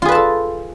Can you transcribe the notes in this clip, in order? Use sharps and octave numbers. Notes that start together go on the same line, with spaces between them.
F4 G#4 A4 B4 A5